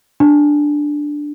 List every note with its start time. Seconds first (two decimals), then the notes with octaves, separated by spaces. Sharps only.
0.20 D4